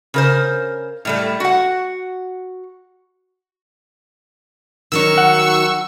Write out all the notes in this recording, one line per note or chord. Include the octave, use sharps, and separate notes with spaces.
C#3 A#4 C5
A2 G3 A3
F#4 F#5
D#3 F#3 D#4 C#6 E6
F#5